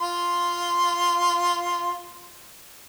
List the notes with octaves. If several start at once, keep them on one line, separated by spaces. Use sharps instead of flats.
F4 C6